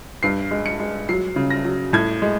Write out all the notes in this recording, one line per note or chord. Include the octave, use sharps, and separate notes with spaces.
G2 C7
G#3
C#7
G#3
F#3 C7
C#3
A#6
F#3
A2 G#6
G#3